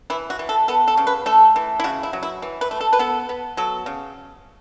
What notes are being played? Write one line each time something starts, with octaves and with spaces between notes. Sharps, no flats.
E3 E4
F#4
E3
A4
B3 A4
A4
C#3
B4
A3 A4
E3
E4
C#3 F#4
E4
F#3
E4
E3
B4
A3
A4
B4
B3 A4
B3
F#3 A4
C#3